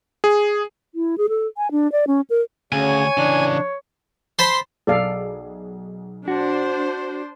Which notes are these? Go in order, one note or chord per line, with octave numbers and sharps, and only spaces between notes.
G#4
E4
G#4
A4
G#5
D4
D5
C#4
A#4
D2 C#3 C#5 G#5
C#3 E3 D4
C5 A5 B5 C6
B1 G#4 A4 D5 F5
D4 F#4 C5